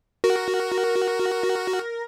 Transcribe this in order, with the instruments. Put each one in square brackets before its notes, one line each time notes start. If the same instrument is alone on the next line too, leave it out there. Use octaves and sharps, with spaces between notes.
[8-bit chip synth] F#4 [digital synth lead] A#4